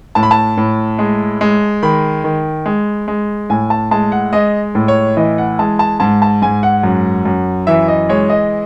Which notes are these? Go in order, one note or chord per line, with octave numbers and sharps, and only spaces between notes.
A2 A5
B5
A5
A2
G#3
G#3
D#3 B5
D#3
G#3
G#3
A2 G#5
A5
G#3 A5
F#5
G#3 D#5
A2
C#5
E3 D#5
F#5
G#3 A5
A5
G#2 A5
A5
G#2 G#5
F#5
F#2
F#2
E3 E5
D#5
G#3 C#5
D#5